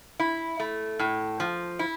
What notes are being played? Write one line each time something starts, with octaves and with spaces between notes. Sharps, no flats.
E4
A3
A2
F3
E4